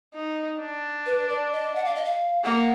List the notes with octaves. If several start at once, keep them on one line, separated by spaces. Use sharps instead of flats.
D#4
D4
B4
D5
D#5
F#5
F5
D#5
F5
A#3 F#5